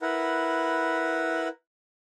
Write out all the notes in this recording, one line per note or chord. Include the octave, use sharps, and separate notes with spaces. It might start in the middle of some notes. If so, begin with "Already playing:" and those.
E4 A#4 B4 F#5